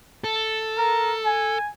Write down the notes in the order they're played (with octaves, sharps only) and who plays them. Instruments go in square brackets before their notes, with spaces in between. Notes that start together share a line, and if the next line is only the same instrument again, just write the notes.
[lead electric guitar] A4
[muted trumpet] A#4
G#5